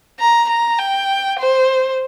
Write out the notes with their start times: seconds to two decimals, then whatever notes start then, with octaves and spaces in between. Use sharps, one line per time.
0.20 A#5
0.49 A#5
0.79 G5
1.39 C5